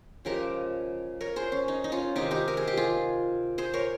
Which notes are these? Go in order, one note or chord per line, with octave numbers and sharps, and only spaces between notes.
C#3 F3 G#3 G4 A#4
A#4 C#5
G#4 C5
C#4
D#4
D#4
C#4 F4
C3 D#3 G#3 D#4 G4
D#4 G4
A#4
G#4
G4
F4 G#4
G#4 C5
A#4 C#5